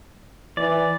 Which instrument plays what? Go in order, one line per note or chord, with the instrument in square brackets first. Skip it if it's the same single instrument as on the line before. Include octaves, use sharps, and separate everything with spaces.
[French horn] E3 [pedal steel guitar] D5